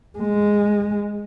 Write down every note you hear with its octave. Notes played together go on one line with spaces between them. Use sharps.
G#3